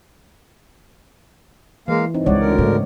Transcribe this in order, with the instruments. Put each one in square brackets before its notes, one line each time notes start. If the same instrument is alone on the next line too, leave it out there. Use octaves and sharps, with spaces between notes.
[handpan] E3 [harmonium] G#3 A#3 F5
[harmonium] G2 [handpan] C4 D#4
[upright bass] C#2 [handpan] C#5 D5 F#5
[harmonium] D2 D3 A#4
[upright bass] G#2 [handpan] C#3 A3